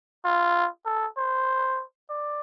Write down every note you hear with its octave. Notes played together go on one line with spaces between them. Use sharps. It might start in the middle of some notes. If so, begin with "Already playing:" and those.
F4
A4
C5
D5